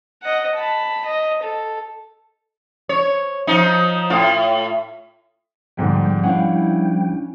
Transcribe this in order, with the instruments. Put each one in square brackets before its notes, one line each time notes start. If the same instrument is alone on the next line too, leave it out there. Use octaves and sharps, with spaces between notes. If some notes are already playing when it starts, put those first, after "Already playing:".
[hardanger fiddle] D#5 F#5
A5 B5
D#5
A4
[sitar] C#5
F3 D#4
A2 F4
[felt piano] E2 G#2 D3 [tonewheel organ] F3 G3 G5
[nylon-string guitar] C#4 D4 F5 [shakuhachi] E4 [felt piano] F#5